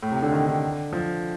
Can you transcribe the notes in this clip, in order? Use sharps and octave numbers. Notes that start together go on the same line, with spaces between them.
A2
C3
D3
D#3
D3
F3